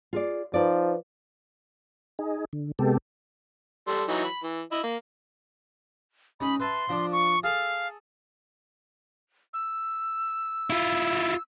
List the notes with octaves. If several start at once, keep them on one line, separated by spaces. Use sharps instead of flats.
F4 G#4 D5
F3 D#4 B4 D5
D#4 G#4
D3
C3 G#3 B3 G4 A4
G3 A4 C6
E3 F#3 D#4
B5
E3
E4 D#5
A#3
G#3 C#4 D#4 B5
B4 E5 A5 C6
F3 D4
C#6
G#4 A4 F5
E6
E4 F4